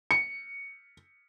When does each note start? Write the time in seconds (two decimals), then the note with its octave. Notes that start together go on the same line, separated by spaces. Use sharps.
0.11 C#7